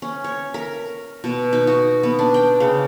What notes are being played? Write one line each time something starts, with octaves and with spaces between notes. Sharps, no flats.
C#4
C#5
A#4
B2
D#4
F#4
B3
D4
G5
C#3